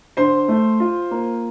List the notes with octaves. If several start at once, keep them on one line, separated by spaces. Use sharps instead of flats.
D3 C5 C6
A3
F4
A#3